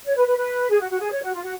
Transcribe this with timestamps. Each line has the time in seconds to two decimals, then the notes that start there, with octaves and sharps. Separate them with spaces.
0.05 C#5
0.16 B4
0.27 B4
0.37 B4
0.69 G#4
0.80 F#4
0.90 F#4
1.01 G#4
1.11 C#5
1.22 F#4
1.33 F4
1.43 F#4